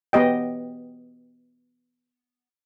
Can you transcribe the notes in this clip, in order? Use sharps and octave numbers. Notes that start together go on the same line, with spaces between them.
B3 G4 D#5 G5